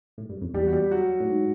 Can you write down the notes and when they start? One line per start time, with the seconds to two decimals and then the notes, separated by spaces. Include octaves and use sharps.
0.18 A2
0.29 G2
0.41 F2
0.54 E2 G3 G4
0.67 F#4
0.73 G3 G4
0.91 F#3 F#4
1.20 A2
1.29 G#2